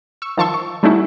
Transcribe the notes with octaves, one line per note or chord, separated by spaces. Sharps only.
C#6 E6
D#3 F3 A5 C6 C#6 E6
C#6
G3 A3 C#4 D#4 E4 F#4